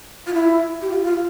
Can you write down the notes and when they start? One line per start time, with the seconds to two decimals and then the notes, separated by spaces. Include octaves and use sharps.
0.27 F4
0.33 E4
0.81 G4
0.90 F4
1.04 F4